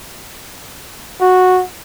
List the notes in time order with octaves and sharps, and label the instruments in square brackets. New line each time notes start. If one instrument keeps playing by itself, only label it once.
[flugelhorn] F#4